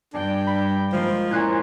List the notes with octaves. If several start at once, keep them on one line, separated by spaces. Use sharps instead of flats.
G2 D4 G5
B5
F3 G#3 A#3 F4
A#2 C#4 E4 C6 F#6 G#6